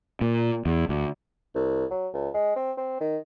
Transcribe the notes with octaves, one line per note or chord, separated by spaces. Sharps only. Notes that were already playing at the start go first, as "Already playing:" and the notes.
A#2
E2
D2
C2
F#3
C#2
G#3
C4
C4
D#3